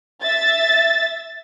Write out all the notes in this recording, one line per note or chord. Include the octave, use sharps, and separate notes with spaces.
E5 A6